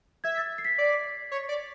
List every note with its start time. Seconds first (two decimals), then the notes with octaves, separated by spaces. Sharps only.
0.24 E5 G#6
0.37 A6
0.58 C7
0.65 B6
0.78 D5
1.32 C#5
1.49 D5